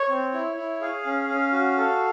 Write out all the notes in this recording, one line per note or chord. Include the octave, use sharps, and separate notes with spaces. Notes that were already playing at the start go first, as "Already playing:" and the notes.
Already playing: C#5
C4
E4
E4
G#4 F5
C#4
C#4
F#4
A4